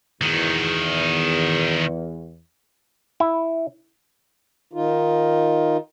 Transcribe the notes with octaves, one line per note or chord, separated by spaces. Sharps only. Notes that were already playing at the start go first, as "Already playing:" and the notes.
E2 D#3 F#4
E4
D#3 D#4 F4